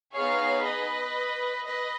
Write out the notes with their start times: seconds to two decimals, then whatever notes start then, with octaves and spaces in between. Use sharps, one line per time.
0.12 B3 D#4 G#4 C#5 F5
0.63 B4 D#5
1.65 B4 D#5